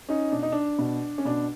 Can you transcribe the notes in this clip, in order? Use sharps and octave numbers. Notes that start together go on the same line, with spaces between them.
C#4 D#4
B2 D4
D#4
D4
B2
C#4
B2 D4